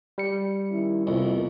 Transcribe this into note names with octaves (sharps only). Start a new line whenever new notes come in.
G3 C#7
D#3 C#4 E4
C2 F2 A#3 B3 E4